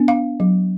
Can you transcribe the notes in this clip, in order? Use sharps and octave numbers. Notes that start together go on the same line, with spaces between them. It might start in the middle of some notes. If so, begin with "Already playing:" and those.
Already playing: B3 D4
F5
F#3